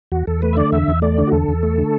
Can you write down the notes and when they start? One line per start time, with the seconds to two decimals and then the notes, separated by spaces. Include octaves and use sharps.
0.12 E2 F#4
0.27 E2 A4
0.42 A3 B4
0.53 E5
0.57 D3 D5
0.72 E2 E5
0.88 E2
1.02 A3 D5
1.18 D3
1.27 F#4
1.32 E2 A4
1.48 E2
1.63 A3
1.78 D3